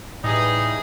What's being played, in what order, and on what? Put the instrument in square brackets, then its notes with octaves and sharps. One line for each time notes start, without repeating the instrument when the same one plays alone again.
[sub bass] A2 [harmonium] E3 [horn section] G3 D#4 [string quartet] G#4